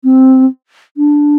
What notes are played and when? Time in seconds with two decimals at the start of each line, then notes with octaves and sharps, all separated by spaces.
0.04 C4
0.97 D4